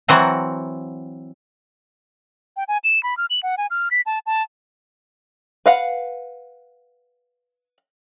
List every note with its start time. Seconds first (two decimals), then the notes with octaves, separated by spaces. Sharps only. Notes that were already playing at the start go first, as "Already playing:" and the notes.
0.08 E3 F#3 C4 F#5 G5 A#5
2.57 G5
2.68 G#5
2.84 E7
3.03 B5
3.17 F6
3.30 F#7
3.43 F#5
3.58 G#5
3.70 F6
3.91 B6
4.06 A5
4.26 A5
5.66 B4 F5 F#5